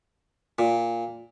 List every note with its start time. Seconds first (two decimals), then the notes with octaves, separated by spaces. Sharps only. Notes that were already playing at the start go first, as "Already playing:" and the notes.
0.59 A#2